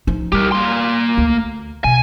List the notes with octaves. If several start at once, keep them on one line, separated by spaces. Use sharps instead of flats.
F3 D#4
G3 G4 A#4
A#3 C6
D2
B2 G#5